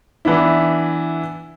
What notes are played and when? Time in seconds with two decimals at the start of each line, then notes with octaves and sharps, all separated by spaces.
0.25 E3 B3 D4 E4